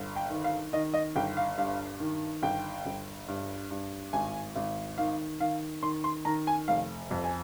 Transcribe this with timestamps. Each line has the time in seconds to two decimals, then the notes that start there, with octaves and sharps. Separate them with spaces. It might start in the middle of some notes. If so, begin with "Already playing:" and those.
Already playing: G1
0.16 G5
0.30 D#3
0.44 F5
0.73 D#3 D#5
0.94 D#5
1.16 G1 G5
1.37 F5
1.58 G2 F5
2.00 D#3
2.43 G1 G5
2.86 G1
3.28 G2
3.71 G2
4.13 G#1 G#5
4.56 G#1
4.98 D#3 F5
5.40 D#3 F5
5.83 D#3 C6
6.04 C6
6.25 D#3 A#5
6.47 G#5
6.68 F1 F5
7.11 F2
7.24 G#5